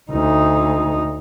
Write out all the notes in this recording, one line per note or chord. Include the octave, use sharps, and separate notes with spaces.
D2 D#4